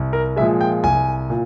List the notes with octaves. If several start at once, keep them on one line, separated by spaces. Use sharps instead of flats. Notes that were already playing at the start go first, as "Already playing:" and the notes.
Already playing: C2
A#4
A#2 F3 G#3 E5
G5
C2 G#5
A#2